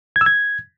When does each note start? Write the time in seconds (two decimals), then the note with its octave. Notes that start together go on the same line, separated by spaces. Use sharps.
0.16 G#6
0.21 E6
0.26 G#6